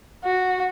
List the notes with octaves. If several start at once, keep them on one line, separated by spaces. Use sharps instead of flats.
F#4